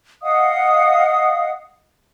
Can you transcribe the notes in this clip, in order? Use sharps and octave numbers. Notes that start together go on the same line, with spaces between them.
D#5 F5 F#5 D#6